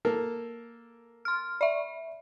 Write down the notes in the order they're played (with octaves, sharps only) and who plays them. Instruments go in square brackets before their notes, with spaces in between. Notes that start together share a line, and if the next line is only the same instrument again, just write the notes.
[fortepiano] A#3 A4 A#4
[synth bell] C6 F6
D5 E5